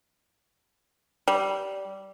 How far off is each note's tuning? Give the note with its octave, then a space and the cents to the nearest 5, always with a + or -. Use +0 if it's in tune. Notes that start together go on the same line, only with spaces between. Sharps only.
G3 -15